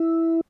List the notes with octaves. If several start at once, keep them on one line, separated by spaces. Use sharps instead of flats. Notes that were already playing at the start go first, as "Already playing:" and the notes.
Already playing: E4